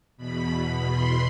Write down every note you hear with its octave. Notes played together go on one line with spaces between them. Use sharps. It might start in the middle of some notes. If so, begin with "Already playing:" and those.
E2 B2 B5
C6